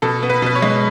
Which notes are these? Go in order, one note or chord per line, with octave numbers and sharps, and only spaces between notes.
B2 A4
B3
B4
B2 B4
C#5
G#3